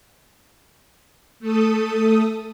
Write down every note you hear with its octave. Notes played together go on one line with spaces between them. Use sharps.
A3 A4 D#6